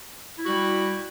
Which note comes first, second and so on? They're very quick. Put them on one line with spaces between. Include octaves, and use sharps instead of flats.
E4 F#4 G3